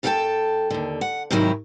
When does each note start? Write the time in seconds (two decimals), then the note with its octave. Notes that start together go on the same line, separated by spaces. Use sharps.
0.03 F#2 F4 A4 A#4 G5 A5
0.70 D#2 D3
1.01 F#5
1.31 G#2 C3 D#3 F#3 E4